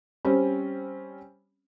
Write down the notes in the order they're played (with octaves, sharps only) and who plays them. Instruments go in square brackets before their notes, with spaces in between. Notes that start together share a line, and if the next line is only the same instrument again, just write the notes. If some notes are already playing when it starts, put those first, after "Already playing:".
[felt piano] G3 C4 C#4